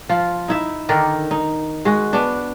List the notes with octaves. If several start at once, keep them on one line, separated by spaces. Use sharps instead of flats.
F3 F4
D#4 E4 E5
D3 D#3 A#4 D5
D#4
G#3 F#4
B3 D4